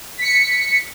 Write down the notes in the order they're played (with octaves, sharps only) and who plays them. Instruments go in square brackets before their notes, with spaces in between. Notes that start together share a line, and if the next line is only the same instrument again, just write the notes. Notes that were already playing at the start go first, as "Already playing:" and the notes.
[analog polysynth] B6 C#7